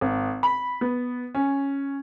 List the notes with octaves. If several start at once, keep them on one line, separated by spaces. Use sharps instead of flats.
G#1
B5
B3
C#4